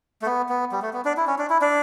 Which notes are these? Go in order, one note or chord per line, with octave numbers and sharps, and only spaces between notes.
A3
B3
B3
G3
A3
B3
D4
E4
C#4
D4
E4
D4